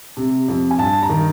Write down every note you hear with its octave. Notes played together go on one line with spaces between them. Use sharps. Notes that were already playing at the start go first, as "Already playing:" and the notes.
C3
F2
G#5
G2 A5
A#5
D#3